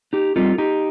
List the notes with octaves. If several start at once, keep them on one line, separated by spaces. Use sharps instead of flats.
D#4 G4
G3 C4 D#4 F4 A4
D#4 G4